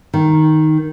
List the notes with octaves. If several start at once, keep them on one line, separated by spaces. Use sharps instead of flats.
D#3